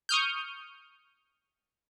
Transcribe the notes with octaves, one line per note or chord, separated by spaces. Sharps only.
C#6 D#6 F6 G6